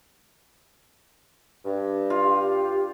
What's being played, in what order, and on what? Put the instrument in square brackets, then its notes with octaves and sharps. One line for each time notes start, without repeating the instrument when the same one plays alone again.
[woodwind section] G2
[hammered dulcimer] F4
[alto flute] G4